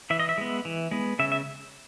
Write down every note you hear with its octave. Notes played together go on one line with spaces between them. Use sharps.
E3 E5
D#5
E5
G#3 B3
E3
G#3 B3
C#3 E5
E5